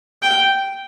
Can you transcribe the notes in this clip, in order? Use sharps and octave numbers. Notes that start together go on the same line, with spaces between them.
G5